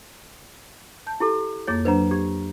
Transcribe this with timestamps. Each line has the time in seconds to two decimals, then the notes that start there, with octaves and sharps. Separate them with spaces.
1.07 A5 G6
1.20 E4 G4 A4
1.67 F2 A#3 G#4 C#5 A6
1.85 F#3 D4 B4 C5 D5 A#5
2.11 G4 G#6